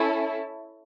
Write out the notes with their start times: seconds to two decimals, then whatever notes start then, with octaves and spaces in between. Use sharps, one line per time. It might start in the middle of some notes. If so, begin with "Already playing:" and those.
Already playing: C#4 E4 A4